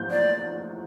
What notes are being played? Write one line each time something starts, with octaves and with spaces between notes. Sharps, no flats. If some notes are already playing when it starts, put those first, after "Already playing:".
Already playing: G6
D5